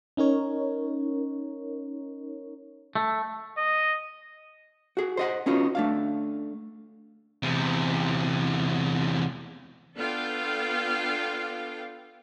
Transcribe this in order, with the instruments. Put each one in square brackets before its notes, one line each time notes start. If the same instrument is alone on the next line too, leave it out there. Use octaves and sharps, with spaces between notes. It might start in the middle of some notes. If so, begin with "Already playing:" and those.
[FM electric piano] C#4 D#4 A#4 C#5
[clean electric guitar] A3
[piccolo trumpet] D#5
[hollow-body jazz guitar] F#4 G#4
C5 D#5 F#5
B3 C#4 D#4 F4 F#4
A3 D4 F5
[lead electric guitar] E2 C3
[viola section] B3 D4 F4 A4 F5 G5